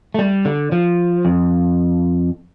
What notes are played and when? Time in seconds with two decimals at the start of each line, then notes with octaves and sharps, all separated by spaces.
0.14 A3
0.19 G3
0.45 D3
0.72 F3
1.25 F2